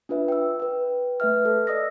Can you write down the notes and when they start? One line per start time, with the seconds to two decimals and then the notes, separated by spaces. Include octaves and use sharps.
0.09 D4 F4 B4 E5
0.28 G5 E6
0.60 B4 G5
1.20 A3 B4 E5 F6
1.45 A4
1.67 D5 D#5 D#6 E6 A#6